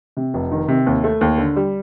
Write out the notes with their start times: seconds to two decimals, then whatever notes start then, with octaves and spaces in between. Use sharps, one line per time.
0.17 C3
0.34 F1
0.52 D#3
0.68 C3
0.86 D#2
1.04 A3
1.21 D#2
1.38 D3
1.56 G3